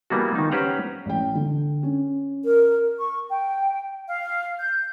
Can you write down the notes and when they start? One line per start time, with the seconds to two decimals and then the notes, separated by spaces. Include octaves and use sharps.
0.10 E3 G3 A#3 B3 F4 F#4
0.35 D#3 D#4
0.51 C#4 G4 B4 C5 F#5 A#5
1.06 A1 G5
1.35 D3
1.83 C#4
2.45 A#4
2.99 C#6
3.28 G5
4.09 F5
4.58 G6